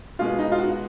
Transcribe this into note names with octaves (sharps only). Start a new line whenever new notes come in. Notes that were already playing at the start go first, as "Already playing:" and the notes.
B2 G#3 B3 F4
D#4
F4
F#4